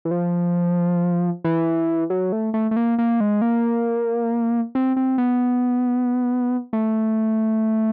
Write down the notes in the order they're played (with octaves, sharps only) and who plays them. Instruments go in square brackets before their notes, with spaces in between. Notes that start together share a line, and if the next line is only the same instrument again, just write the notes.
[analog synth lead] E3
F3
E3
F#3
A3
A3
A3
A#3
A#3
G#3
A#3
C4
C4
B3
A3